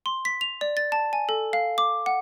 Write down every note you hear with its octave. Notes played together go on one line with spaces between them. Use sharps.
C6
B6
F7
D5
A6
A5
G#5
A4
F5
D6
F#5